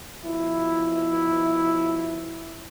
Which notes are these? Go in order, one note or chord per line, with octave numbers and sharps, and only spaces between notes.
B2 F3 E4